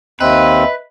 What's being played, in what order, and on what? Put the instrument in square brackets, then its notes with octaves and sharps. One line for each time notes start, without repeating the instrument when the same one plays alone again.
[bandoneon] D#2 C4 [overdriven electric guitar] B4 [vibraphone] D#5 E5